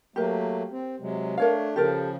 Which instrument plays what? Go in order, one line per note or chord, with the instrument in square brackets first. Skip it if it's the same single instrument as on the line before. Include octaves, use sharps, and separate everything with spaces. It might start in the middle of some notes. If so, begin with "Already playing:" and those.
[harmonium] F#3 A3 A#3 [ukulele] G4 A#4
[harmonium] C4
C3 F#3 G#3
[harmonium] A3 D4 [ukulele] A#4 C#5 F5
[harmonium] C#3 F3 [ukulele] G4 A4 A#4